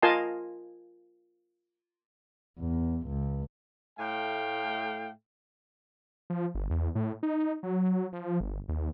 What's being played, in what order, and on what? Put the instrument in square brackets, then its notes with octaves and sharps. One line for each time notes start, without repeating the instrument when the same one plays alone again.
[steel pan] F4 A#4 D#5 G#5 A5 C6
[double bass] E2
C#2
[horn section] A2 A3 F5 G5
[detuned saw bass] F3
G1
E2
A2
D#4
F#3
F3
G1
D#2